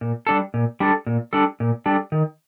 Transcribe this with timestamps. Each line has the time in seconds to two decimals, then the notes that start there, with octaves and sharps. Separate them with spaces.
0.01 A#2
0.27 G3 D4 A4
0.54 A#2
0.80 G3 D4 A4
1.06 A#2
1.33 G3 D4 A4
1.60 A#2
1.86 G3 D4 A4
2.12 D#3